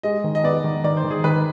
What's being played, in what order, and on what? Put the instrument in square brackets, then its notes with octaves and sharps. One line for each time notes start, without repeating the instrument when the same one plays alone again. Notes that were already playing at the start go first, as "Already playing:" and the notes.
[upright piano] G#3 [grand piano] D#5
[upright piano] D#3
[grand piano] D#5
[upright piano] B3 [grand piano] D5
[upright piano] D#3
[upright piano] D#3 [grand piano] D5
[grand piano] C5
[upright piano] D#3
[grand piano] G#4
[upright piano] D#3 [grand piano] B4